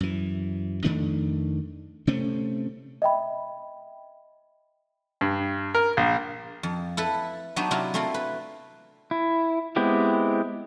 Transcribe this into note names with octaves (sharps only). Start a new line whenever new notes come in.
F#2 E3
F2 D#3 A3 D4
C3 A3 C4 C#4
D#5 E5 G5 B5
G2
A#4
A#1
F2
E4 A4 B4
F#3 B3 D4 D#4 F#4 G4
C3 F#3 E4 F4
A3 A#3 C4 E4 F4
B4
E4
G#3 B3 C4 E4 G4